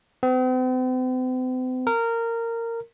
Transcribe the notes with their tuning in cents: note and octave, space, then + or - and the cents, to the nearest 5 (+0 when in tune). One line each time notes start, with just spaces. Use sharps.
C4 -45
A#4 -15